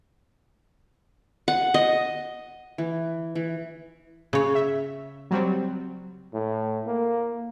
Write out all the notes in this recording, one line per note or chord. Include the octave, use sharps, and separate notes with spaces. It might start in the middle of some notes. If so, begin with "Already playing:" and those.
F#5
D#5
E3
E3
C#3 C#5
E5
F#3 G3 C4
A2
A#3